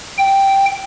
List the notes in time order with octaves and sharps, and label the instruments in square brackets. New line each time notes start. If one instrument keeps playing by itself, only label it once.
[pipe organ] G5